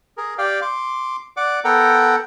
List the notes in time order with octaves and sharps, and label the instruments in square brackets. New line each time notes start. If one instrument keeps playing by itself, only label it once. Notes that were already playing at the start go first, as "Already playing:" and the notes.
[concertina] G#4 A#4
G4 D5 F5 G5
C6 D6
D5 F#5 D6
B3 A4 A#4 F#5 G5 A#5